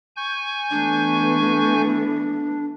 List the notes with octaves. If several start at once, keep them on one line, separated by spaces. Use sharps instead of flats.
G#5 C#6 G6
E3 A3 B3 D4